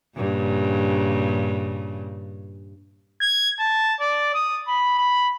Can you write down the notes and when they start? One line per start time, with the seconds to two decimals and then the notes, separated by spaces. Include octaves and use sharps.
0.17 G2 A#2 C#3
3.21 G#6
3.59 A5
4.00 D5
4.34 D#6
4.67 B5
4.98 B5